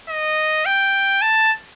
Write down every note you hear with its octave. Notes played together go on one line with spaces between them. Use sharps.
D#5
G5
A5